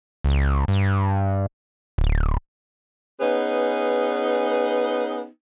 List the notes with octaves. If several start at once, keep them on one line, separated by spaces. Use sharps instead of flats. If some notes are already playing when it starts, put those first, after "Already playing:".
C#2
G2
D1
B3 C#4 D#4 G#4 B4